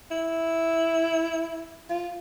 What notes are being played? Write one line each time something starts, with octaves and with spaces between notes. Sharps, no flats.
E4
F4